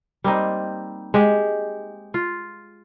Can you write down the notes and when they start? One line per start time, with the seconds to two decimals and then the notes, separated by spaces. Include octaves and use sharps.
0.24 G3 A#3 C4 D#4
1.14 G#3 G4
2.14 F4